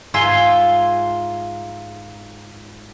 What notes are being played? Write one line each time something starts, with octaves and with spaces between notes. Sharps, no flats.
G#2 F4 E5 G#5 A#5 C6